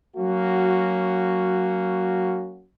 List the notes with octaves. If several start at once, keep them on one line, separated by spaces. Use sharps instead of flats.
F#3 A#3 C#4 F#4